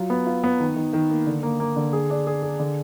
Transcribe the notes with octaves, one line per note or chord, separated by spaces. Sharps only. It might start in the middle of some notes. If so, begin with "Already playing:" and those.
Already playing: F#3 F4
B3
F4
B3
D#3
D#3
D#3
A#3
D3
A#3
A#3
D3
G#4
D4
G#4
G#4
D3